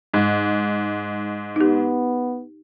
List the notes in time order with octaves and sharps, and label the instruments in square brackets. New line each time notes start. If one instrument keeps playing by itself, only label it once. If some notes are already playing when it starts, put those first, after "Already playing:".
[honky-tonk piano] G#2
[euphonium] B3 [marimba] D#4 G4